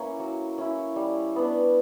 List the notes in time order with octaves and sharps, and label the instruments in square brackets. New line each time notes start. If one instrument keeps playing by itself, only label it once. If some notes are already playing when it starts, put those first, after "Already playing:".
Already playing: [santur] A#3 C#4 E4 C#6
F#3
C#4 E4
G3
B3 D4